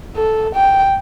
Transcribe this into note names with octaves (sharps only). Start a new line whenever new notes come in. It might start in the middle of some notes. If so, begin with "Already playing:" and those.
A4
G5